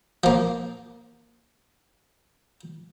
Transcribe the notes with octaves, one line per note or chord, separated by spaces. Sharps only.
F3 A#3